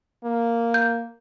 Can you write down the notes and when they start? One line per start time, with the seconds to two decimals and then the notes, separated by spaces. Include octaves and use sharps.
0.24 A#3
0.74 G6